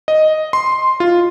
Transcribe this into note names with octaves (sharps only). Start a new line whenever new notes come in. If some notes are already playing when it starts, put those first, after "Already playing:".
D#5
C6
F4